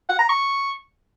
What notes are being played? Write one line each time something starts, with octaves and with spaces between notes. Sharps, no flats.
F#5
A#5
C#6